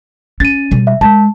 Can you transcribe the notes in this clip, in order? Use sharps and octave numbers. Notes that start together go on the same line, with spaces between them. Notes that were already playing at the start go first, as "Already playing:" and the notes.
C#4 A6 D#7
B2 G3
E5
G#3 A5